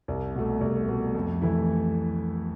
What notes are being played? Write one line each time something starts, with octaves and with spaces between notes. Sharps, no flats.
C2
B2 A3
C2
B2 A3
F2
E3 A3 E4